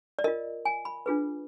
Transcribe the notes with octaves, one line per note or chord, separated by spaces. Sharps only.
D5
F4 A#4 D#5
G#5
B5
D4 F4 G#4 B4